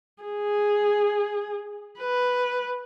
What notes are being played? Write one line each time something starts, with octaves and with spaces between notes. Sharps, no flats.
G#4
B4